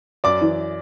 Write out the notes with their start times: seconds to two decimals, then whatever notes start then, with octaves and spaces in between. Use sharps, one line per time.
0.24 F#2 D5 D6
0.41 E3